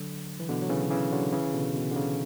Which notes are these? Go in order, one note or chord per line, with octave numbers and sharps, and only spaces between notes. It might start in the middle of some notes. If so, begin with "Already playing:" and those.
Already playing: D3 F#3
E3
B2 D3
F#3
C#3 E3
C#3 E3
D3 F#3
C#3 E3
B2 D3
B2
D3
C#3